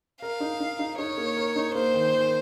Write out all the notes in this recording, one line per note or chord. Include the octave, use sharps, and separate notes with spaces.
A#4 F5
D#4
D#4
D#4
D#4 C#5
A#3
A#4
D#4
A#3 C5
D#3
D#3